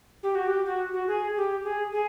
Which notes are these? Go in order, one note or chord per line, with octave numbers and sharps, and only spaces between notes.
G4
F#4
G4
F#4
F#4
G#4
G4
G#4
G#4